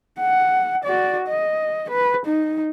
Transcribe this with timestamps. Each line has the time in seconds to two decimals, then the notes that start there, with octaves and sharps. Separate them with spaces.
0.20 F#5
0.85 F#4 D5
1.28 D#5
1.90 B4
2.26 D#4